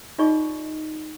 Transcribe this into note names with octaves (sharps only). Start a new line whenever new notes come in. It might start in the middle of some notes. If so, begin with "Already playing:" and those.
D#4 F4 G#4 D5 D#5 C#6